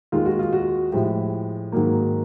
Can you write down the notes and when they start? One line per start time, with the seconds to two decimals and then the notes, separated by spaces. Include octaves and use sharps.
0.12 D#2 D#3 G#3 F4
0.26 F#4
0.39 F4
0.53 F#4
0.92 A2 F3 G#3 G4
1.72 G#2 D#3 F#3 A#3